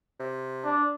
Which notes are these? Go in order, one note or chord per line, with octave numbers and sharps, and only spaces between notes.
C3
D4